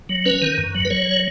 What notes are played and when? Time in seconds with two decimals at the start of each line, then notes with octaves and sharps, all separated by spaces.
0.09 F#3
0.26 C#4 B4
0.42 D#3
0.58 F#2
0.75 F#3
0.85 B4
0.90 F#3 C#5